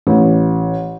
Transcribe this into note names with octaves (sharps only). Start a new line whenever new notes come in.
A1